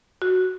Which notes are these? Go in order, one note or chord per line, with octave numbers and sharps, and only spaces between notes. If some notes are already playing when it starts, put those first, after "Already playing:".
F#4